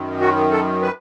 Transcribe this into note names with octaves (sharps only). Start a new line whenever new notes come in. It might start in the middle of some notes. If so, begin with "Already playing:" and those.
Already playing: F#2 D#3
F#4
A4
B4